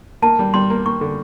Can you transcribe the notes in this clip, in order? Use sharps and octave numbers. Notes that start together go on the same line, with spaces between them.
A#3 A5
G3
G3 C6
A#3
A#3 C#6
D3